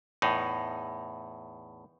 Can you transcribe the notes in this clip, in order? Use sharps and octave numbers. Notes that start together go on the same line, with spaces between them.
E2 A2 D#4